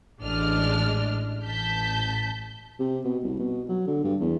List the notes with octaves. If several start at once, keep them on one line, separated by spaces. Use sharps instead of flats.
A1 G#3 D4 D#5 F6
A1 A5 G6 B6
C3
B2
C2
B2
F#3
D3
G2
E2